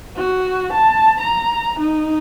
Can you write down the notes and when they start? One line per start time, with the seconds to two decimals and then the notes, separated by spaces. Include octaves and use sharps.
0.16 F#4
0.73 A5
1.20 A#5
1.80 D#4